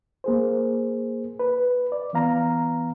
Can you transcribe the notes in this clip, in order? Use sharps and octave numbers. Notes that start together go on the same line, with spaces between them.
A#3 G#4 C5
B4
D5
E3 B3 F5 A#5